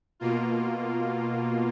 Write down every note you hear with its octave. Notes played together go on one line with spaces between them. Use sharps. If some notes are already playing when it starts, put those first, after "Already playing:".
B2 A#3 F4